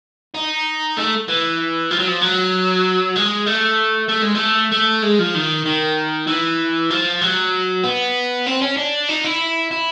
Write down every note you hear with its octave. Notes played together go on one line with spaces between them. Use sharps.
D#4
A3
E3
F3
F#3
F3
F#3
G#3
A3
A3
G#3
A3
A3
G#3
F3
D#3
D#3
E3
F3
F#3
B3
C4
C#4
D4
D#4
E4
E4